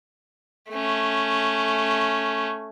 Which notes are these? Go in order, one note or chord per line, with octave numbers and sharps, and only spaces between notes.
A3 C#4